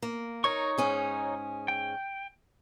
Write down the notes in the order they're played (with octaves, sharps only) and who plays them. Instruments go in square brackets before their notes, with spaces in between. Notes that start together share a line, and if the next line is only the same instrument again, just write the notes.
[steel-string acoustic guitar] A#3
[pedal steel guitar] D#4 C#5 C#6 [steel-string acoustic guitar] A#4
[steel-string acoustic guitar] G#2 C#4 G#4
[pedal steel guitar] G5